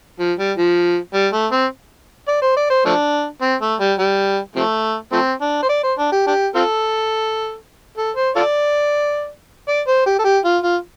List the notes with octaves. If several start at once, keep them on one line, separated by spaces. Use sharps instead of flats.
F3
G3
F3
G3
A3
C4
D5
C5
D5
C5
F3 A3 D4
C4
A3
G3
G3
C3 F3 A3
F3 A3 C4
D4
C5
D5
C5
D4
G4
D4 G4
C4 F4 A4
A4
C5
F4 A4 D5
D5
C5
G4
A4
G4
F4
F4